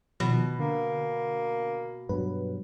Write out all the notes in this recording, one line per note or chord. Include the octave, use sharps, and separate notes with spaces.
B2 D#3 F3
D3 A#3
G2 B2 F#3 B4